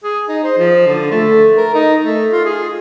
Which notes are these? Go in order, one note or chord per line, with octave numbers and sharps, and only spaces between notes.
G#4
D#4
C5
F3
D3
A3
A#4
D#4
A3
F4
G#4